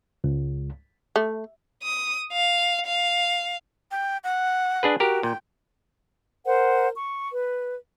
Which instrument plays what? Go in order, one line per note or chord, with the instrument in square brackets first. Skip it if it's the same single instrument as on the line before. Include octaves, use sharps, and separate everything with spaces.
[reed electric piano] C#2
[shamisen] A3
[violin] D#6
F5
F5
[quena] G5
F#5
[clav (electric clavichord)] D4 G#4 B4
[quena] F#4 [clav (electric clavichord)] G4 A#4
[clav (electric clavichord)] A#2 [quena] G5
[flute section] A#4 C5 F#5
C#6
B4